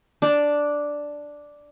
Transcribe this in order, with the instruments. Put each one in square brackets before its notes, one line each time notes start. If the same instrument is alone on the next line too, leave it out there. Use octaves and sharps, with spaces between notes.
[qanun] D4 D5